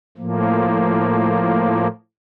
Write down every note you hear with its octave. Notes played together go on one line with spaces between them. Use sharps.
A2 F3 A#3